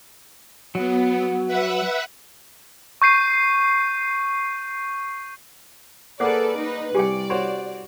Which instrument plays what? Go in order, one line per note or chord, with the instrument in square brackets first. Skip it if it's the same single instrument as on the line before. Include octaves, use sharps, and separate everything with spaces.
[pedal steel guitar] F#3 [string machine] B3
[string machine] B4 E5 F#5
[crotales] C#6 G6 C7 D#7
[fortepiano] A#3 G#4 [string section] A4 B4 D5 [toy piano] C5 F#5 D6
[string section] D#4 B4
[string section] C2 D5 [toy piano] G4 G5 [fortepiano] G#5 D6
[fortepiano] F#4 C5 C#5